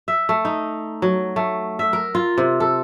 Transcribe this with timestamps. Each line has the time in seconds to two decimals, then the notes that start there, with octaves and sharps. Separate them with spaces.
0.08 E5
0.29 A3
0.45 D#4
1.02 F#3
1.36 A3
1.79 E5
1.93 A#4
2.15 F4
2.38 C3
2.60 A4